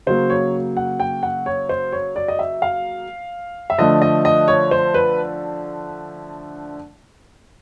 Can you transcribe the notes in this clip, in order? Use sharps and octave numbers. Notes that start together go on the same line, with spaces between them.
C#3 F#3 A#3 C5
C#5
F#5
G5
F#5
C#5
C5
C#5
D5
D#5
E5
F5
E5
D3 F3 A3 D#5
D#5
D#5
C#5
C5
B4